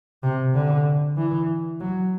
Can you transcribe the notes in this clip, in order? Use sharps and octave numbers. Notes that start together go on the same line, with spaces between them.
C3
D3
E3
F#3